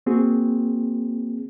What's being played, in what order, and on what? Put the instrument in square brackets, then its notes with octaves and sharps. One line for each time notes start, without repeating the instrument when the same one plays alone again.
[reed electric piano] A#3 C4 F#4 G#4